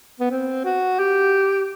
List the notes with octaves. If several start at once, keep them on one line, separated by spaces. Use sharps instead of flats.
B3
C4
F#4
G4